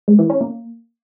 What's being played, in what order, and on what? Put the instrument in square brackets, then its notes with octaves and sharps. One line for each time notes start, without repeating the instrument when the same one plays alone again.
[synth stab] G#3
E3
C#4
A#3